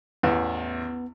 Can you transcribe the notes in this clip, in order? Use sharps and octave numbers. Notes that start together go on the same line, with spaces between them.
A1 E2 B3